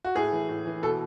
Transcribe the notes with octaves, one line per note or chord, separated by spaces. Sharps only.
F#4
A2 G#4
E3
A2
E3
B2 A4